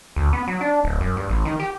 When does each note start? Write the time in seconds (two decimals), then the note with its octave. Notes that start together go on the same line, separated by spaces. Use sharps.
0.16 D2
0.33 B3
0.48 F#3
0.61 D4
0.84 D1
1.01 F#2
1.17 G2
1.30 A1
1.45 D#3
1.60 G4